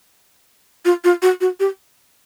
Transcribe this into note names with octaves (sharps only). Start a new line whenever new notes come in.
F4
F4
F#4
F#4
G4